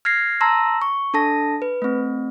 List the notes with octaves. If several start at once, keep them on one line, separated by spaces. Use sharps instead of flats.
F6 G#6 A#6 C7
A5 A#5 C6 E6 A#6
C#6
D4 A4 A5 A#6
B4
A3 C4